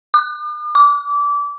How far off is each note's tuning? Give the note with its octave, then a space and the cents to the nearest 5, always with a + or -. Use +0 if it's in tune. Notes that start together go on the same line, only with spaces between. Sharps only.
D6 +45
D6 -25